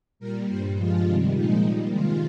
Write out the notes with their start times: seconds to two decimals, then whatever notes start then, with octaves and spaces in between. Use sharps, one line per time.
0.19 A#2 G3 A#4
0.48 G2 G3 C5
0.76 G2 F3 G#3 F4
1.05 C3 D#3 G3
1.33 A#2 F3 G#3 D#4
1.62 A#2 G3
1.90 C3 D#3 G#3 F4